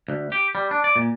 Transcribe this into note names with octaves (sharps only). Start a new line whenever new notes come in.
D2
G4
G3
D4
D5
A#2